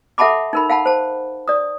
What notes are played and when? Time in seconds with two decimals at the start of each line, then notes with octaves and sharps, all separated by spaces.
0.18 A4 E5 F#5 A5 B5 D6
0.53 D#4 A#4 B5
0.70 F5 F#5 A5 B5
0.86 C5 A5
1.48 D5 D#6